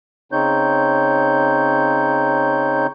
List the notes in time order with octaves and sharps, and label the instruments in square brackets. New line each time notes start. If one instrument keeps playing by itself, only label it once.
[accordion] C#3 C4 D#4 C#5 G6